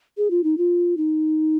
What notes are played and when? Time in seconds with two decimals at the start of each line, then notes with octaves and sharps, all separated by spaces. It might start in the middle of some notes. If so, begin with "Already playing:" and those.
0.17 G#4
0.30 F4
0.44 D#4
0.58 F4
0.97 D#4